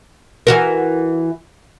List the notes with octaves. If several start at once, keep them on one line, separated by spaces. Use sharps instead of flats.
E3 F#4 A#4